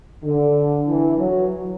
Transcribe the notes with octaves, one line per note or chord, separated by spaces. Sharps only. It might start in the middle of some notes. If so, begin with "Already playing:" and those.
D3
E3
F#3